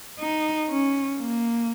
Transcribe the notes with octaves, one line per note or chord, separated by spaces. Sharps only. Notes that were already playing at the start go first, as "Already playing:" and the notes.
D#4
C#4
A#3